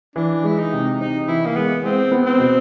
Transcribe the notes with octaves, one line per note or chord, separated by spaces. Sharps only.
E3 D4
G#3 E4
D#4
C3
C4 D#4
E3 E4
A#3
G#3 B3
G#3 C4
B3
C4
B2